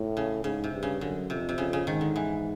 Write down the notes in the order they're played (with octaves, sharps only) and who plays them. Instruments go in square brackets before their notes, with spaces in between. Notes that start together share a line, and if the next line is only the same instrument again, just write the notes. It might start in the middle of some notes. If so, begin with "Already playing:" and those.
Already playing: [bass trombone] A2
[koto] C#3
[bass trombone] G#2 [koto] C#3
[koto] C3
[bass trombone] G2
[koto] C#3
[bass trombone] F#2 [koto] D3
[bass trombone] F2 [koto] C3
[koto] C3
[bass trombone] F2 [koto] C#3
[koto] C#3
[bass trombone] G#2 [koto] D#3
[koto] D3
E3